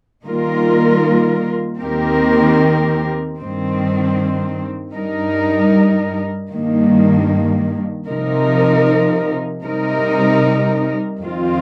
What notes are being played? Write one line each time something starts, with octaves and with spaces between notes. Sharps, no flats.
D#3 G3 A#3 F4 A#4
D#2 D#3 C4 G4 A#4
G2 D#3 C4
G2 G3 D#4 A#4
G2 D#3 A#3
C3 F3 D#4 A#4
C3 G3 D#4 A#4
F2 D#3 C4 F4